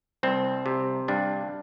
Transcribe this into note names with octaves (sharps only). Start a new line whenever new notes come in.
C2 C4
C3
G2 D4